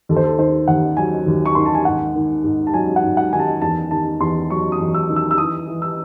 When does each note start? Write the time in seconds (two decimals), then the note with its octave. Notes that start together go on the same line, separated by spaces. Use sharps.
0.09 D#2 A4
0.16 C5
0.24 A4
0.39 D#3 C5
0.68 D#2 F#5
0.97 F#3 G#5
1.26 D#2
1.46 C#6
1.55 D#3 C6
1.66 A5
1.75 G#5
1.85 G#2 F#5
2.15 D#3
2.44 G#2
2.67 A5
2.74 F#3 G#5
2.96 F#5
3.03 G#2
3.17 F#5
3.33 D#3 G#5
3.39 A5
3.62 E2 A5
3.91 D#3 A5
4.20 E2 C6
4.50 F#3 C#6
4.72 D#6
4.79 E2
4.94 E6
5.09 D#3
5.16 E6
5.31 E6
5.38 E3 D#6
5.67 E3
5.82 E6